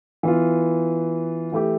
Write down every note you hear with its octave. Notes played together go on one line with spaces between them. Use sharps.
E3 B3 F4
E3 A3 E4 G4